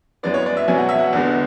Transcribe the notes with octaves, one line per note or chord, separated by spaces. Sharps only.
F#2 E3 G#3 B3 D5
C#5
D5
E5
B2 F#3 C#4 G#5
F#5
E5
F#5
E2 D3 G#3 B3